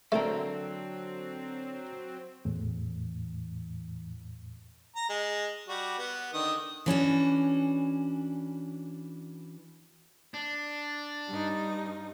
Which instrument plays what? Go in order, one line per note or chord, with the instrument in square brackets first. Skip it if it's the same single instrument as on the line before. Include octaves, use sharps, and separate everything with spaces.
[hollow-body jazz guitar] D3 A4 A#4 [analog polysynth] F#3 C4 [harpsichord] A3
[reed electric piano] E2 A2 [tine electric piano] E3
[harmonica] A#5
G#3
G3 F#4
B3
D3 D#3 D#6
[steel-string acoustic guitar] E3 C#4 D4 F#4
[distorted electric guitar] D4
[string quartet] G2 D#4